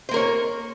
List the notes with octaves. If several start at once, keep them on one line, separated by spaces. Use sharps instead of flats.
A#3 A#4 C5 C#5